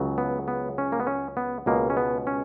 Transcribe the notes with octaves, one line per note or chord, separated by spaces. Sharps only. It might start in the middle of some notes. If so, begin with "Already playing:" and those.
Already playing: C#2 C#3 F#3
B3
B3
C#4
A#3
B3
C#4
B3
C#2 B2 G#3 A#3
C#4
B3
C#4